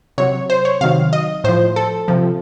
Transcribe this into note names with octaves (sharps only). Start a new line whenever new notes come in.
C3 F#3 C#5
C5
C#5
C3 D#3 F#3 F5
D#5
A2 F3 C5
A4
C3 F3